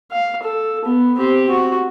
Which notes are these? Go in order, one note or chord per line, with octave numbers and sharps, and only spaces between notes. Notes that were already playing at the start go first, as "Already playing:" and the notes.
F5
A4
B3
C4 G4
F#4